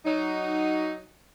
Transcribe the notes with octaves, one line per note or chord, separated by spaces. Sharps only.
F#3 D#4